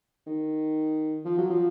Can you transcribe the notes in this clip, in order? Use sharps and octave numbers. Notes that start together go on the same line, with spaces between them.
D#3
F3
F#3
F3